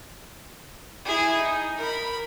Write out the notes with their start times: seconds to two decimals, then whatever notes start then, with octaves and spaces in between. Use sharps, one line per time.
1.05 E4 G#4
1.37 D#4
1.78 A#4 B5